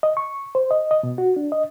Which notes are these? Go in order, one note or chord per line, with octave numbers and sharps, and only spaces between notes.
D#5
C#6
C5
D#5
D#5
B2
F#4
D4
D#5